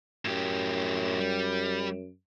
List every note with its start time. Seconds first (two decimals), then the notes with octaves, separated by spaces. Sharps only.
0.25 F#2 A2 G4
1.20 G3